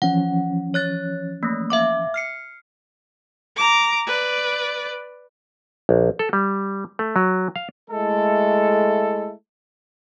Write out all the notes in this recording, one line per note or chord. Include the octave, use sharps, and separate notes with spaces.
E3 F3 C#4 F#5
C#5 F#6 A6
A3 A#3
E5 F5 D6
F6 C7 C#7
A#5 D6
B4 D5
A#1
A4
G3
A3
F#3
F5
G#3 A3 E4 A4